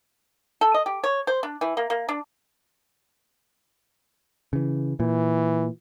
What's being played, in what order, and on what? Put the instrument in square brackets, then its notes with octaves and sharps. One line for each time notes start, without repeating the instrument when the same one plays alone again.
[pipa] A4
D#5
G4
C#5
C5
D4
E3
A#3
A#3
D4
[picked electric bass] C#3 E3
[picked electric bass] A#2 [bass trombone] E3